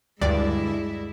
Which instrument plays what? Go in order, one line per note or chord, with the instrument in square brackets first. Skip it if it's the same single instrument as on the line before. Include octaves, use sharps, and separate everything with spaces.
[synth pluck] D2 G2 D5 [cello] G#3 E4